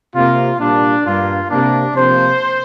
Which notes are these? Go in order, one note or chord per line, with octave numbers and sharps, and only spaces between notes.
C3 A#3 F4
A#2 G3 A#3 D4
G2 G3 A#3 F4
C3 A#3 D4
C3 F3 A#3 C5